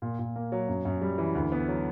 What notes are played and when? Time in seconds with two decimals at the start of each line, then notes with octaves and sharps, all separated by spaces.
0.02 A#2
0.19 A#2
0.36 A#3
0.52 F#3
0.68 F#2
0.85 F#2
1.01 G3
1.18 E3
1.35 D2
1.52 B3
1.68 F#3